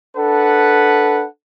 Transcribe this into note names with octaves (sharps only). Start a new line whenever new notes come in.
D4 A4 B4 F#5